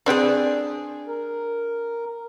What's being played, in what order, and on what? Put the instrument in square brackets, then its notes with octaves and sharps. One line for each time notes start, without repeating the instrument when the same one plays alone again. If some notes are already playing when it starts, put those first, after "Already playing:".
[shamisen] C4 B4 G5 [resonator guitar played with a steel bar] D4 G#4
[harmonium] A#4